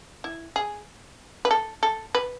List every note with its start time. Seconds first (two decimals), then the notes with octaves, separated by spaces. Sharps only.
0.24 E4
0.56 G#4
1.45 B4
1.51 A4
1.83 A4
2.15 B4